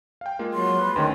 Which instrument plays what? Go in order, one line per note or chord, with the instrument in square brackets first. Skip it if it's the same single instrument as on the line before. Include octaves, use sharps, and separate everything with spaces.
[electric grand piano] F5 G5
G#3 A#3 F4
[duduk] F#3 [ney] C6
[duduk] B4
[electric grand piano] D2 C#4 C#5 [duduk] D#3